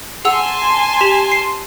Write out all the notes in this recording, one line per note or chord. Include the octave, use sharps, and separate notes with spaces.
G#4 F#5 G#5 A5 C6 E6
G4 B6 F7
C7 E7